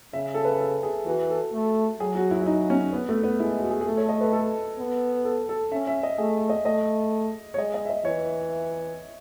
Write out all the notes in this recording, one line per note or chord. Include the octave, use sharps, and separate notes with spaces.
C#3 E5
A4
B4
A4
G#4
E3 F#4
A4
A3
F#3 G#4
F#4
E4
E4
D#4
C#4
B3
A3
B3
G#3 E4
F#4
G#4
G#4
A3 A4
C#5
D#5
B4
A4
B3
A4
A4
C#4 E5
E5
D#5
A3 G#4
D#5
A3 D#5
C#5
G#3 D#5
D#5
E5
D#5
E3 C#5